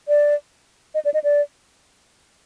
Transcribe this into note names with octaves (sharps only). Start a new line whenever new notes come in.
D5
D#5
D5
D#5
D5